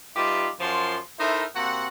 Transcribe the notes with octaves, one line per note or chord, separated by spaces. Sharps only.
G3 D#4 F4 G4 B4 E5
F#2 F3 C6
D#4 E4 A4 A#4 C5 E5
C3 A#3 C4 F#4 F#5